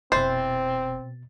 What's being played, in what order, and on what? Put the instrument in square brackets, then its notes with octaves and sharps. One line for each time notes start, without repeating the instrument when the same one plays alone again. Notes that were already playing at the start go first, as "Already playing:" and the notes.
[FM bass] F1 [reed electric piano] B2 A6 [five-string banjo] E3 C5 [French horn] C4